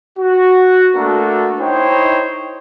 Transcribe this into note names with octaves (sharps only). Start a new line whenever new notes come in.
F#4
A3 A#3 D4 F#4 A4 A#4
D#4 E4 C5 C#5 G5